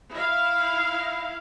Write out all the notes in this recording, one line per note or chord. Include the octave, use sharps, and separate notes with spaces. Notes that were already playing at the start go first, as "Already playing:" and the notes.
E4 F5